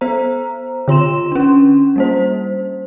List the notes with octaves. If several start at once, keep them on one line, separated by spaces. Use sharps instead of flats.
B3 C5 A#5
D3 F4 C6 E7
C#4 D4
G3 A#3 C5